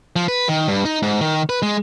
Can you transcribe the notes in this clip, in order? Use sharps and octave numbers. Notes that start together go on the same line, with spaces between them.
F3
B4
D#3
G2
D#4
G#2
D#3
B4
G#3